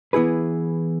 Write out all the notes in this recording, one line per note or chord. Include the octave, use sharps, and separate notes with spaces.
E3 B3 E4 G#4 B4